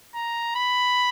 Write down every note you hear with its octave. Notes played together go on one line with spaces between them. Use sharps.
A#5
B5